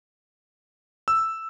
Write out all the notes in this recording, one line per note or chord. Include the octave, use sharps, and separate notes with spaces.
E6